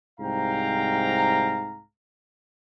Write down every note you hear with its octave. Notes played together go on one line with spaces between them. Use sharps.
C2 G#2 F5 G5 A#5